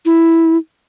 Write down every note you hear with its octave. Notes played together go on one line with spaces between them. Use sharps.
E4